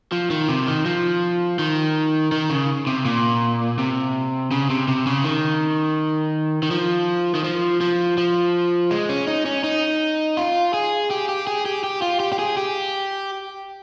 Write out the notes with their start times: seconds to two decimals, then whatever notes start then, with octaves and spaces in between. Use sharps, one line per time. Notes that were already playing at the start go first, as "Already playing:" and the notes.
0.12 F3
0.31 D#3
0.49 C3
0.67 D#3
0.85 F3
1.59 D#3
2.32 D#3
2.50 C#3
2.87 C3
3.05 A#2
3.78 C3
4.51 C#3
4.70 C3
4.88 C3
5.06 C#3
5.24 D#3
6.63 D#3
6.71 F3
7.35 D#3
7.44 F3
7.81 F3
8.18 F3
8.91 G#3
9.09 C#4
9.27 D#4
9.46 C#4
9.64 D#4
10.37 F4
10.74 G#4
11.11 G4
11.29 G4
11.47 G#4
11.65 G4
11.84 G4
12.02 F4
12.20 G4
12.33 G4
12.39 G#4
12.57 G4